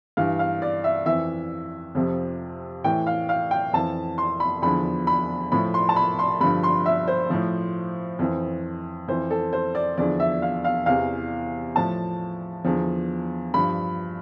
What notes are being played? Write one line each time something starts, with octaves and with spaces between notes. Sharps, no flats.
G2 E3 F5
F5
D5
E5
F2 E3 E5
F2 C3 F3
A2 E3 G5
F5
F5
G5
F2 E3 A5
C6
B5
E2 D3 F3 B5
B5
A2 F3 B5
C6
A5
B5
C6
G2 D3 F3 B5
C6
E5
C5
A2 F3
F2 E3
F2 E3 C5
A4
C5
D5
E2 D3 F3 D5
E5
F5
F5
E2 C3 E3 F5
A2 F3 A5
E2 D3 F3
G2 F3 B5